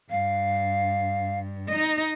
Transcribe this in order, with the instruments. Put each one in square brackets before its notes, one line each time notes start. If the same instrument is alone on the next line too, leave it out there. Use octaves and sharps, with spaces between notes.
[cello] G2 [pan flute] F5
[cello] D#4 D#5